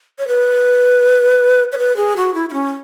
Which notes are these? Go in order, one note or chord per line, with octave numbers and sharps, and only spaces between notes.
C#5
B4
C#5
B4
G#4
F#4
E4
E4
C#4